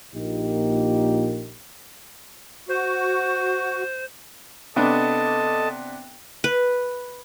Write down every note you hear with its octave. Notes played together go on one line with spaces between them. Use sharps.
A#1 A#2 A#3 D#4 G4
F#4 C5
C3 B3 D4 A4 D#5 A5
B4